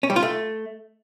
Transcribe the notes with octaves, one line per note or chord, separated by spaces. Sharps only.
C#4
G3
F4
A3